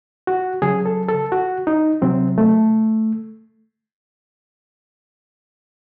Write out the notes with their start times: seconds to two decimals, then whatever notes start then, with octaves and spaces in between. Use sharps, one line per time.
0.27 F#4
0.62 C#3 F#3 G#4
0.86 A4
1.09 A4
1.32 F#4
1.67 D#4
2.02 C3 F#3 C4
2.38 A3